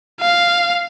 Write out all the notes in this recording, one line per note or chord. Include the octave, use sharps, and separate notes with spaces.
F5